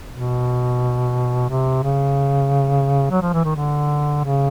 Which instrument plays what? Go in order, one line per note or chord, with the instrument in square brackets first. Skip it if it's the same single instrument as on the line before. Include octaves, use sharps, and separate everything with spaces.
[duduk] B2
C3
C#3
F#3
F3
E3
D#3
D3
C#3